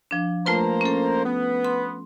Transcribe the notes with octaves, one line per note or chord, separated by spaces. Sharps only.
F3 D4
A3 A#3 F4 B4 C5 A#5
C#4 A4
B3
C6